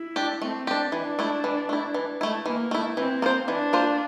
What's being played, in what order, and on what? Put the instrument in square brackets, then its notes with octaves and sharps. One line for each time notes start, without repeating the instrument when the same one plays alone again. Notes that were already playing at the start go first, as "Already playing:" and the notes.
Already playing: [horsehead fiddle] E4
[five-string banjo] D4 G4
[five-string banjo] A3 [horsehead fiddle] C4
[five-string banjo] D4 G4
[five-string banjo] E3 [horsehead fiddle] D4
[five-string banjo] A3 E4
E3
A3 E4
E3
A3 E4
[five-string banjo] E3 [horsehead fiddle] A#3
[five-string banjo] A3 E4
[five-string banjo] E3 [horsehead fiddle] C4
[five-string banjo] A#3 F4 C5
[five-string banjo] E3 [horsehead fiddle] D4
[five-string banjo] A#3 F4 C5